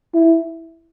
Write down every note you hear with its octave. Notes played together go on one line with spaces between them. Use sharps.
E4